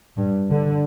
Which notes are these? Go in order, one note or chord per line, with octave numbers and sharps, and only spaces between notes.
G2
D3